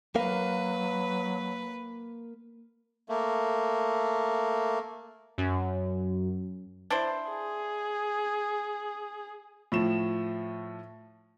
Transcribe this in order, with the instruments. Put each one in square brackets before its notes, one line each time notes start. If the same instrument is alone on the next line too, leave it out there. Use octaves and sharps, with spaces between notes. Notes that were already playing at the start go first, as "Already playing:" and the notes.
[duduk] F#3 [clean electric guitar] A#3 A#4 F5 [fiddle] B4
[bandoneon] A3 A#3
[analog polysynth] F#2
[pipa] D4 E4 C5
[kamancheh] G#4
[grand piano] A2 F3 E7